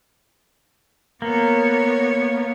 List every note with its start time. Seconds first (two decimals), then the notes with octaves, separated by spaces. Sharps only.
1.22 A#3 B3 C#5